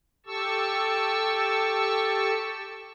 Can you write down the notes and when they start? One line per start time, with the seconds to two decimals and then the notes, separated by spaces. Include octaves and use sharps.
0.26 G4 A4 A5 C#6 E6